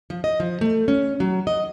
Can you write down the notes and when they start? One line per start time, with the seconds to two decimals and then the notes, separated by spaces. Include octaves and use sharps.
0.10 F3
0.24 D#5
0.40 F3
0.61 A3
0.88 C#4
1.20 F#3
1.47 D#5